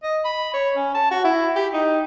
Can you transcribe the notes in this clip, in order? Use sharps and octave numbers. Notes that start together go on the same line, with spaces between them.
D#5
B5
C#5
C#4
A5
F#4
E4
G4
D#4